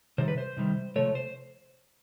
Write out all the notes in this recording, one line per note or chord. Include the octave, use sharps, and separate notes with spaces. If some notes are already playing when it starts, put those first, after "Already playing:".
C3 D#3 G3 C5
B4
C5
C3 D#3 G3
C3 F3 A3 C#5
C5